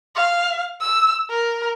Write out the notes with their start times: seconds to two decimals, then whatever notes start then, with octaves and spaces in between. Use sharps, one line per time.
0.15 F5
0.81 E6
1.30 A#4